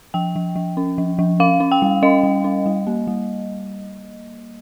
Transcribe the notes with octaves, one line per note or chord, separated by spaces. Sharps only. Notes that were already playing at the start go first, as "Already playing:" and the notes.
F3 G5
F3
F3
C#4
F3
F3
C#4 F5
C#4
G5
G3
C#4 D#5
G3
C#4
G3
A#3
G3